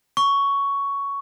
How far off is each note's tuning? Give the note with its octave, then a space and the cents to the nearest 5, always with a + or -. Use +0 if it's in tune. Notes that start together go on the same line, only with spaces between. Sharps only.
C#6 +10